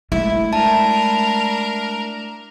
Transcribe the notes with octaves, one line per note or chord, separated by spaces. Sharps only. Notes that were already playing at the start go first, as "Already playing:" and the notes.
G#3 A3 E4
D4 E4 A#4 A5